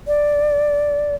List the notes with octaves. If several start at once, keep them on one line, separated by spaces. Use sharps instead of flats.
D5